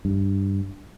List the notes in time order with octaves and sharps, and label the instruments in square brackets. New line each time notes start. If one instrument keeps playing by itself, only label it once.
[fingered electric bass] G2